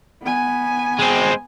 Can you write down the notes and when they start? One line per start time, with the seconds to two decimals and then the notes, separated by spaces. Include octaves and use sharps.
0.23 B3 G#5
0.99 G#3 C4